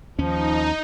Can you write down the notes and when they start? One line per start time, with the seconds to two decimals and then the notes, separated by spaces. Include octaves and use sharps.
0.18 D#2 F3 C#4 D#4